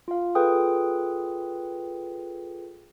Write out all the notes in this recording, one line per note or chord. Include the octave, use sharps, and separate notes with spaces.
F4 F5
F4 G#4 A4 B4 G5 D#6